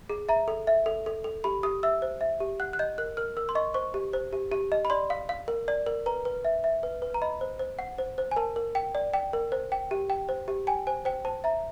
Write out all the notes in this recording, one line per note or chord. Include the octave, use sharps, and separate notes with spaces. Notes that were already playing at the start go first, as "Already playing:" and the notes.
G#4
E5 A#5
A4
E5
A4
A4
A4
G4 B5
G4 D#6
E5 E6
C5
E5
G4
F#5 F#6
F#6
D#5 G6
A#4 F#6
A#4 F6
A#4 E6
C6
D#5 C#6
C5 C#6
G4
C5
G4
G4
D#5
B5
D5 C6
F5
F5
A#4
D5
A#4
B4 A#5
B4
E5
E5
B4
B4
A#5
D#5 B5
C5
C5
F#5
C5
C5
G#5
A#4 A5
A#4
G5
D5
G5
A#4
C5
G5
G4
G5
C5
G4
G5 G#5
C5 G#5
C5 G5
C5 A5
E5 A#5